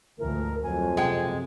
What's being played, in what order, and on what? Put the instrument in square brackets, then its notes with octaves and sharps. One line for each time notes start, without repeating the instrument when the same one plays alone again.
[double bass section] D2 G#2 [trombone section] E3 F3 A3 [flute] A#4
[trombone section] F2 [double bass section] F#3 [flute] G#5
[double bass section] F#2 C3 [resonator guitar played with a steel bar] G#3 G5